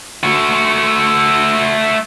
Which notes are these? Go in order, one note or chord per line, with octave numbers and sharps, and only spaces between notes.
A3 F#4